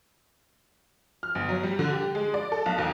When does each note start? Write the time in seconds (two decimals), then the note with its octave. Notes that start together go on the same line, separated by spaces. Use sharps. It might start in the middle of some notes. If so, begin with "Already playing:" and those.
1.23 F6
1.35 G1
1.49 F#3
1.63 G3
1.79 D3
1.93 G4
2.15 G#3
2.34 D5
2.52 A4
2.66 B1
2.78 D#2